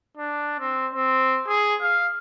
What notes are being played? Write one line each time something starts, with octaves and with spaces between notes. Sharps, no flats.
D4
C4
C4
G#4
F5